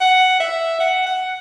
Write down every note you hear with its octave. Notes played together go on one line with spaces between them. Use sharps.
F#5
E5
F#5
F#5